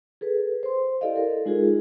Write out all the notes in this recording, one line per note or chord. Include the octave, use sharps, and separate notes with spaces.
G#4 A4 B4
C5 C6
E4 G4 A4 D5 D#5 F5
A4 A#4
G#3 D#4 F4 F#4 G#4